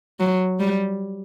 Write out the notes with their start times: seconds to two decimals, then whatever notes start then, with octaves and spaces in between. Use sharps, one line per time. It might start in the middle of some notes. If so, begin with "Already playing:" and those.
0.20 F#3
0.60 G3